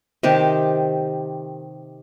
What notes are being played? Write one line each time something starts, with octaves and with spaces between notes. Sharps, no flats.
C3 D#3 G4 A5